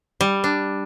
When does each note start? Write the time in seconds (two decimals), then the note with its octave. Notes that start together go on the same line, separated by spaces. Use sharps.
0.21 G3
0.44 D4